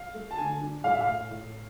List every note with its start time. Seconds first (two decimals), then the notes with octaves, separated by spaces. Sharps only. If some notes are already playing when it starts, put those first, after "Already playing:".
Already playing: F5
0.14 A3
0.31 A5
0.38 D3 G#5
0.61 D4
0.84 A2 F5
0.93 E5
1.01 F5
1.08 A2
1.31 A2